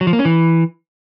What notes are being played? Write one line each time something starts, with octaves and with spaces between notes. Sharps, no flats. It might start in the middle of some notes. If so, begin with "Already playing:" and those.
F#3
F3
A#3
C#4
E3